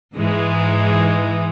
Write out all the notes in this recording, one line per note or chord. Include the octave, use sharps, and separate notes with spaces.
G#2 E3 G#3